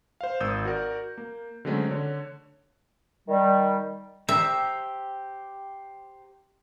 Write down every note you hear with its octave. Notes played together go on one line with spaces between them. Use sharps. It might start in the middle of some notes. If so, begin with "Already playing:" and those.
C5 F5
G#1 D#6 E6 G6
F#4 A#4 D5
A#3
D3 F#3 G#3 A3 C4 C#4
D3 C#5
D#3 G3
G4 C5 E5 A#5